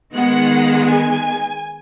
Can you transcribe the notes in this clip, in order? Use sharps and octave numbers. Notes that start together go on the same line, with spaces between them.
D#3 G#3 B3 F#5
G#5